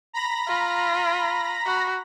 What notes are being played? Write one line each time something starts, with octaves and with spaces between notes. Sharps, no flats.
A#5 B5 A#6
F4
F#4